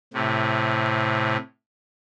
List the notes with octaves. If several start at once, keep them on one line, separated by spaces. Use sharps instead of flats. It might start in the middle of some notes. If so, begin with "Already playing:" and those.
A2 C3